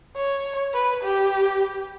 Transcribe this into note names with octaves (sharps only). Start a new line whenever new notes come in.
C#5
B4
G4